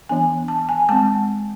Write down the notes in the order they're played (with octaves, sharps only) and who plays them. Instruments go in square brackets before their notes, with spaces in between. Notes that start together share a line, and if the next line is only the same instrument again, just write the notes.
[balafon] E3 B3 D4 G#5
A5
G#5
G#3 C4 A5